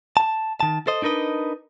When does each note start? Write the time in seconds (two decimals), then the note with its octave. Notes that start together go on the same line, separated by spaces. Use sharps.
0.17 A5
0.60 D#3 A5
0.87 A4 C5 D#5
1.02 D4 D#4 A#4 B4 D#5